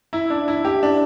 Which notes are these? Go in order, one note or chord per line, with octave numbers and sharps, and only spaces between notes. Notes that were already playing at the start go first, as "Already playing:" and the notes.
E4
D4
E4
G4
D4